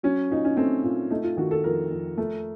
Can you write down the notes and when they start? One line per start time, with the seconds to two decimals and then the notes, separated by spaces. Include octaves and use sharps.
0.03 F#3 C#4
0.30 A#2 D#4
0.44 C#4
0.57 A3 C4
0.83 A#2
1.10 A3 D#4
1.23 F4
1.37 D#3 F#4
1.51 A4
1.64 F2 A#4
1.91 F2
2.18 A3